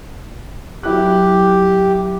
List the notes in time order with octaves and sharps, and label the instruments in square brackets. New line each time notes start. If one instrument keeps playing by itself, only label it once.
[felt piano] F#3 E4 F#6 [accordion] G4